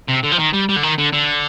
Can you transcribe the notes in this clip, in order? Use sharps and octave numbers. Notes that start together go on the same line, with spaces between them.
C3
D3
F3
D#3
G3
G3
D3
D#3
D3
D3